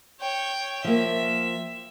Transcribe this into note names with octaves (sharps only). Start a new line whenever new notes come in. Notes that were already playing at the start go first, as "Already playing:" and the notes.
C#5 G5
F3 A#3 E5